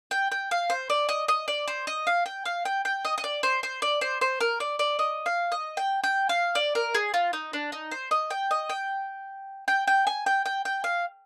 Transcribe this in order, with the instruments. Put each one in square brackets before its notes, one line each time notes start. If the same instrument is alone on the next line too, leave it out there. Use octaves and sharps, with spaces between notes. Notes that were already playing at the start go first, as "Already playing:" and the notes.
[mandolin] G5
G5
F5
C5
D5
D#5
D#5
D5
C5
D#5
F5
G5
F5
G5
G5
D#5
D#5
D5
C5
C5
D5
C5
C5
A#4
D5
D5
D#5
F5
D#5
G5
G5
F5
D5
A#4
G#4
F4
D#4
D4
D#4
C5
D#5
G5
D#5
G5
G5
G5
G#5
G5
G5
G5
F5